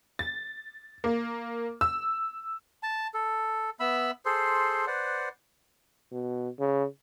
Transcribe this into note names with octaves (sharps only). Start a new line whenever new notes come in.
A6
A#3
E6
A5
A4
B3 E5 B5 E6
G#4 A4 C5 C6
B4 C5 D5 F#5
B2
C#3